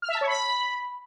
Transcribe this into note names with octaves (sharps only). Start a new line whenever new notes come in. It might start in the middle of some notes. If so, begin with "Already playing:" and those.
F6
E5
A5
C#5
B5